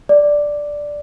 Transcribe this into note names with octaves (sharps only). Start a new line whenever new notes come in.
D5